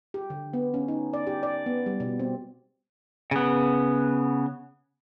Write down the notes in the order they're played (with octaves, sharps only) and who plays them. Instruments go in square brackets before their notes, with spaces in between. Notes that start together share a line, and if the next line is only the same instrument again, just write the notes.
[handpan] G4
D3
B3
C#4
D#4
D5
G4
D5
B3
G3
B2
C4
[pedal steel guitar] C#3 B3